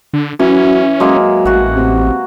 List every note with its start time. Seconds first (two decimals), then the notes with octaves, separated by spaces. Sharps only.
0.13 D3
0.39 E3 F#3 C#4
1.00 F#3 G#3 A#3
1.45 A1 F#4 F#5
1.76 C3